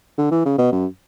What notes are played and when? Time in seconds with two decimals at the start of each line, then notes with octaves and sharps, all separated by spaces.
0.18 D3
0.31 E3
0.46 C#3
0.58 B2
0.72 F#2